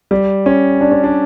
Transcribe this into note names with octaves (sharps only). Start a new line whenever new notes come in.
G3
C#4
D4
C#4
D4